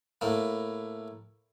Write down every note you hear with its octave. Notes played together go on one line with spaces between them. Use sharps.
A2 A#3